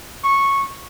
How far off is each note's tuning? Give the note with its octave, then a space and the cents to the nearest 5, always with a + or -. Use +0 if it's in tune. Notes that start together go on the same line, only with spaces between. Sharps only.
C#6 -10